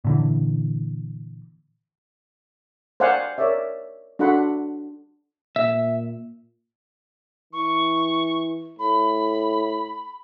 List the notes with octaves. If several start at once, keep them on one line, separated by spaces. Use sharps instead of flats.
A#2 D3 E3
C5 D5 F5 F#5 G#5
A#4 C#5 D5 E5
D4 F#4 A4 F#5 B5 C6
A#2 E5
E3 C#6
A2 B5